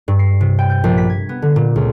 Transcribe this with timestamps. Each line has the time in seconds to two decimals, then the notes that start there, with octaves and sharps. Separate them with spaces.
0.08 G2
0.19 C7
0.41 C3
0.59 G5
0.70 G6
0.84 A#1
0.98 B6
1.10 G#6
1.29 B3
1.42 D3
1.56 A#2
1.76 C#2